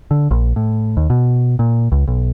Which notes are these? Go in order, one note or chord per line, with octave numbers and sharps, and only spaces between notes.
D3
A#1
A2
D#2
B2
A#2
C#2
B1